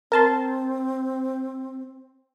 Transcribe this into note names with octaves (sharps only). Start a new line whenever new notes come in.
C4 A#4 A5 C6